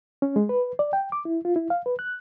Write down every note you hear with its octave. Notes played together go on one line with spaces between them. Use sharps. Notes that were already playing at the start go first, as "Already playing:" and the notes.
C#4
G#3
B4
D5
G5
D6
E4
F4
E4
F5
B4
F#6